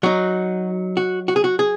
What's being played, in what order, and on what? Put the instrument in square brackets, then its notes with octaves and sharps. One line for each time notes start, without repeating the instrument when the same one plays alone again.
[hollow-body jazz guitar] F#3 D#4 F#4
F#4
F#4
G#4
F#4
G#4